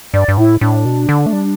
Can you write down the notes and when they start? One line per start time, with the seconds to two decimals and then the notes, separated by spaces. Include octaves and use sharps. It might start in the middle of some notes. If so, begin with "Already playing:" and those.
0.14 G2 D5
0.28 G2
0.37 A2 E4
0.61 A2 D4
0.85 B2
1.09 D3
1.26 A3
1.33 G3